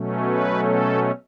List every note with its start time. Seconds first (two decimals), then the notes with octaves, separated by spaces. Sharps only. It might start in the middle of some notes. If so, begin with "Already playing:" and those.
Already playing: B2 F#3 A3 C#4
0.26 B4
0.65 A4